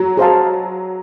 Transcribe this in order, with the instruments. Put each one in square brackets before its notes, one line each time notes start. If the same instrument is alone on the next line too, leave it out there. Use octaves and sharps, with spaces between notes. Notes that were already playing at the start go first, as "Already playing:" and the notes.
Already playing: [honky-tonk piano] F#3
[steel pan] G#4 C5 F5 A5